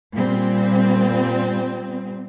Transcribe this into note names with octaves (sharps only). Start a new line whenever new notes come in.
A#2 G3 C4